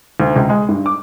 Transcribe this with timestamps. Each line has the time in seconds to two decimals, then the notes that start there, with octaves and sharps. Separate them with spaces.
0.20 D2
0.36 C#2
0.49 G#3
0.69 G2
0.86 D6